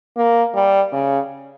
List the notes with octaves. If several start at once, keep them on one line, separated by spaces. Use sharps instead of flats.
A#3
G3
C#3